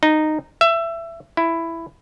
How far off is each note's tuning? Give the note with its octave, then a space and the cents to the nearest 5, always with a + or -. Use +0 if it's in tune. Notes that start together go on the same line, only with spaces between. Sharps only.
D#4 -10
E5 +20
E4 +10